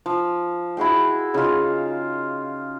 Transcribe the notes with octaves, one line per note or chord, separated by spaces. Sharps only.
F3
E4 F#4 G#4 G5
C#3 D#4 F4